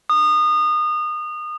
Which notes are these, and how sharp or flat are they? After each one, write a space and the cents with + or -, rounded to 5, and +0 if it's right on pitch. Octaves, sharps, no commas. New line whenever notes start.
D#6 -25